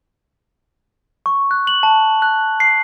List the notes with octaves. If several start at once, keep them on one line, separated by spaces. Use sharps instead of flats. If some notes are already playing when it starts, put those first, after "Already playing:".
C#6
F#6
F#7
A5
F#6
C7